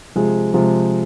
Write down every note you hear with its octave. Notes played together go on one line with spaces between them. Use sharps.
C3 F3 G#3
C3 F3 G#3